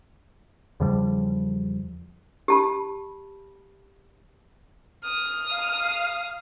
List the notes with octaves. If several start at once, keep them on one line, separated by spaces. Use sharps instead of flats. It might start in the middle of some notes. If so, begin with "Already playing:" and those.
E2 C#3 F3 G3
G4 A5 B5
D#6 F6
F5